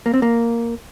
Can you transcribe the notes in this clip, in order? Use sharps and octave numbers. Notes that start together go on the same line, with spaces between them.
A#3
C4
A#3